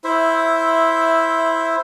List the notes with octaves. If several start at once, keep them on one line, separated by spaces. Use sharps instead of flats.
E4 C5 E5